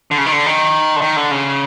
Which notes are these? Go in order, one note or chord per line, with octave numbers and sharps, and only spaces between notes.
D3
C#3
D#3
D3
D#3
D3
D#3
D3
C#3